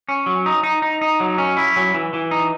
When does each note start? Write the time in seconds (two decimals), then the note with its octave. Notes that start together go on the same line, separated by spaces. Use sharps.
0.09 C#4
0.26 F#3
0.46 D#4
0.63 D#4
0.82 D#4
1.01 D#4
1.20 F#3
1.38 C#4
1.57 E4
1.76 F#3
1.94 E3
2.13 E3
2.31 D#4